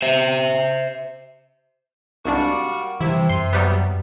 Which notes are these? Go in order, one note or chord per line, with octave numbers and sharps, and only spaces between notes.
C5 E5
C2 G#2 G3 A#3 D4 F#4
C3 E3 G3 E4
F#2 C6
F#3 G3 B3